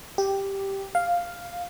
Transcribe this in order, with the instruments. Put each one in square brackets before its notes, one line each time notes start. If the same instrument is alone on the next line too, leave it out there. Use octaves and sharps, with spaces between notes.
[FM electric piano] G4
F5